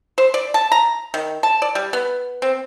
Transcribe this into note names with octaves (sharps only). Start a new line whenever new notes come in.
C5
D5
A5
A#5
D#3
A5
D5
G3
B3
C4